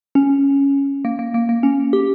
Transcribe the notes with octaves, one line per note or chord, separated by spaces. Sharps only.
C#4
A#3
A#3
A#3
A#3
C#4
G4